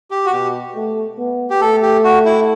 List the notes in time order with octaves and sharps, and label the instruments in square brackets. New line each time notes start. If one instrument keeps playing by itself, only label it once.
[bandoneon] G4
F#4
[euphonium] B2 [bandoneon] G4
[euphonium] A3
B3
[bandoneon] G4
[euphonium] A3 [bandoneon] A4
[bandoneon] G4
F#4
E4